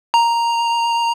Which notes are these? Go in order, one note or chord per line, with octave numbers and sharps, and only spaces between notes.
A#5